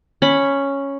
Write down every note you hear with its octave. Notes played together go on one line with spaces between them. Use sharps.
C#4 B5